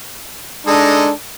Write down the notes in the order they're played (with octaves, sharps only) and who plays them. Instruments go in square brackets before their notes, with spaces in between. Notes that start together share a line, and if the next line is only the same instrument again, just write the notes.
[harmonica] G#3 D#4 A4 [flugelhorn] D4